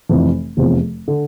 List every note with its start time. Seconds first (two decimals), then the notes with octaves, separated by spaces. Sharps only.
0.09 F1 F2 C3 E3
0.57 F1 E2 C3 F3
1.08 D3